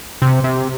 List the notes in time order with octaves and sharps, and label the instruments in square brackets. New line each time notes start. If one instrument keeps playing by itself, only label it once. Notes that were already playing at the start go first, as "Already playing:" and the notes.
[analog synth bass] C3
C3